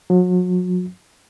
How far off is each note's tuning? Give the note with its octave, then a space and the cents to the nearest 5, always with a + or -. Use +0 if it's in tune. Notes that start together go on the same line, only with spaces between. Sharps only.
F#3 -35